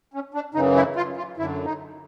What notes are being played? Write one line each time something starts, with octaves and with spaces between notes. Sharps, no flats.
C#4
D4
F#2 C#3 E3 D#4
E4
F4
F4
F#2 D3 E4
D#4